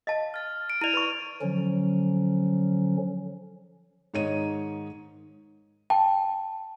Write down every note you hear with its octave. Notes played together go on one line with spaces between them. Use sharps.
D#5 F5 A5
F6 A6
D7
E4 D5 D#7 F7
B4 B5 C#6
D3 F3 F#3 C#4
G#2 D#3 C#5 D#5 D#7
G5 A5